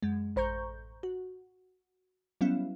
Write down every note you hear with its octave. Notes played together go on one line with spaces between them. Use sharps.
F#2 G#3
A1 C5 A#5 C#6 G6
F#4
F#3 G3 B3 C#4 E4 F5